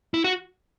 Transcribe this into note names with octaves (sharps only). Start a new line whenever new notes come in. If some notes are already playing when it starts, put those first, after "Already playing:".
E4
F#4